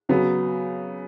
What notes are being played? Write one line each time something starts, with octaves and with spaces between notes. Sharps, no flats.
C#3 F#3 B3